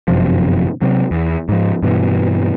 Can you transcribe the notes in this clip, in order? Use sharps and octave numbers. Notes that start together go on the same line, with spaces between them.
G1 F#2 C3 F3
C3 F#3
E2
G#2 F3
G2 B2 E3